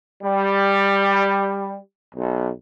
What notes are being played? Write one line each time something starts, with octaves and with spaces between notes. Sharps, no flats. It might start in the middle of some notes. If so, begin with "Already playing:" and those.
G3
B1